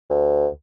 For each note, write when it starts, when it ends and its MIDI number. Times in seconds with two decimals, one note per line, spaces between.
0.10 0.47 38